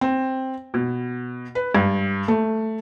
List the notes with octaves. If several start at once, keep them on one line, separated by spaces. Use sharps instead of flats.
C4
B2
B4
G2
A3